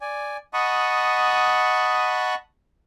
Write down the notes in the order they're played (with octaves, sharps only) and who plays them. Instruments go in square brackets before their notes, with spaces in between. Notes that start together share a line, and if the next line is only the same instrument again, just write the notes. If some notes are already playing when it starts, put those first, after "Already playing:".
[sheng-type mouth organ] D5 G#5
D#5 F#5 A5 B5 C#6 D#6